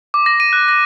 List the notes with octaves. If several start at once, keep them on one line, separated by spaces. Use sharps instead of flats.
D6
A#6
D#7
F#6
A#6